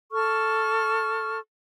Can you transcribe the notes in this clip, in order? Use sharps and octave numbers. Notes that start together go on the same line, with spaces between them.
A4 C#6 F6